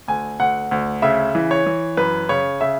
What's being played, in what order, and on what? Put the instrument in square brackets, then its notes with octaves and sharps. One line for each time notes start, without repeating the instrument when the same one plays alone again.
[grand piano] D2 G#5
D2 F#5
D2
C#3 E5
E3
C#5
E3
F#2 B4
C#3 C#5
C#3 E5